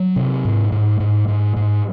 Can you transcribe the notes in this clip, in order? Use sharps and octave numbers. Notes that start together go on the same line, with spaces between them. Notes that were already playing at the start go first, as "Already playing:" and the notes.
Already playing: F#3
C3
G#2
G#2
G#2
G#2
G#2